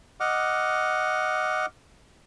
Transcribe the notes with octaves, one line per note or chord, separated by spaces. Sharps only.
D#5 F#5 D6 F6